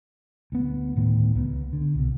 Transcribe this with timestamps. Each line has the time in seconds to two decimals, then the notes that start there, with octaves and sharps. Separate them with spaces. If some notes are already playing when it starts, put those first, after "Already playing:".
0.52 D2 B3
0.96 D1 A2 D#3 B3
1.35 C#2 B3
1.73 D3
1.94 C2 B2